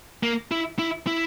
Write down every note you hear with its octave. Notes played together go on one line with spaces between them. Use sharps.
A#3
E4
E4
E4